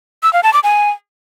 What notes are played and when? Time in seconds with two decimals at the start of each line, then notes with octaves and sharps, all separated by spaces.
0.23 E6
0.33 F5
0.43 A5
0.53 D6
0.64 G#5